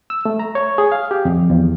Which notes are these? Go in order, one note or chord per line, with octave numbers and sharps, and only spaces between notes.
E6
A3
A#5
C#5
G#4
F5
G4
F2
E2